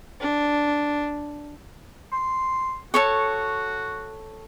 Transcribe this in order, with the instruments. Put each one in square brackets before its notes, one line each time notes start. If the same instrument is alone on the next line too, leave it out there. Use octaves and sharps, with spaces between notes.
[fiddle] D4
[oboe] C6
[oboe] F#4 [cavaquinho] A4 C#5 C#6